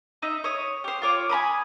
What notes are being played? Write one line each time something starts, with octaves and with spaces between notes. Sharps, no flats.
D#4 D#5 E5
C#5 D#6
G4 C5
F4 C#5 D6
G#5 A#5 B5 D#6